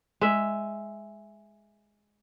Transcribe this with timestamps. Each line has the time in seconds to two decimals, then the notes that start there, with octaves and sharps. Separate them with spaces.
0.21 G#3 E5